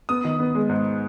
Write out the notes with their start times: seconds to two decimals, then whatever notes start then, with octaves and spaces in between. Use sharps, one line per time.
0.09 B3 D#6
0.25 D#3
0.39 B3
0.55 G#3
0.69 G#2